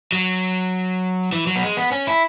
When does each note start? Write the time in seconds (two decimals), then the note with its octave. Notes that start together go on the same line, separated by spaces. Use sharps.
0.12 F#3
1.32 E3
1.47 F#3
1.56 B3
1.62 G#3
1.77 B3
1.92 C#4
2.07 E4